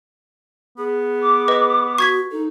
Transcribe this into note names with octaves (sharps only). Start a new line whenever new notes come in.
B3 G#4
D6
B4 D#5
F#4 C#6 G#6 B6
D#4 A4